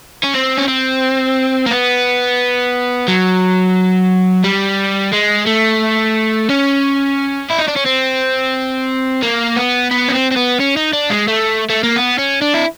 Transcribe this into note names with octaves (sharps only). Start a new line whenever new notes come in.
C#4
C4
C#4
C4
A#3
B3
F#3
G3
G#3
A3
C#4
E4
D#4
D4
C#4
C4
A#3
B3
B3
C#4
C4
C4
B3
C#4
D#4
D4
G#3
A3
A3
A#3
B3
C#4
D4
E4